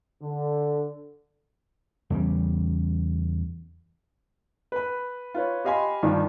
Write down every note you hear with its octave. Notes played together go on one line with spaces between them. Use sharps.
D3
E2 C#3 G3
B4 B5
F4 B4 C#5
G4 D#5 F5 G#5 B5 C6
G2 D#3 F3 D5